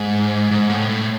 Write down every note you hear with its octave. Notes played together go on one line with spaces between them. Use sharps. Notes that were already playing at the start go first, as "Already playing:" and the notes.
Already playing: G#2
G#2
A2
A2